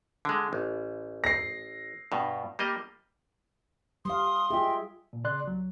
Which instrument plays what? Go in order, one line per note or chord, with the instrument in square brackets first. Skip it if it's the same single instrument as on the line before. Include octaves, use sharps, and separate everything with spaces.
[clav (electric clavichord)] D3 G#3
A1
[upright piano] A#6 C7
[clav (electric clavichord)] G2 B2
G3 A#3 D#5
[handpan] G3 F5 [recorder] C6 [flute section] D#6
[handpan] F4 G#4 [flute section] D#5 E5 G5
[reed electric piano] A#2
C#3 D5 C6 F#6
C2 F#3